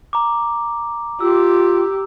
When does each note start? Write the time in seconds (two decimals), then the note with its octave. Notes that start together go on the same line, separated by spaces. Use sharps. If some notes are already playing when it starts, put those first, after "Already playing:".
0.13 A#5 D6
1.21 F4 G4 E6